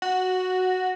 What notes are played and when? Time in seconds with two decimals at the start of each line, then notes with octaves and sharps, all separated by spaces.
0.02 F#4